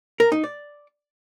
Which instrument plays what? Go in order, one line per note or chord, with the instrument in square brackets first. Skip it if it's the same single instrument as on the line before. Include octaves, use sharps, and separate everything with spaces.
[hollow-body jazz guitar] A#4
D#4
D5